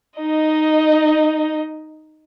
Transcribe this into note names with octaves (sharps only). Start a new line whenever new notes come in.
D#4 D#5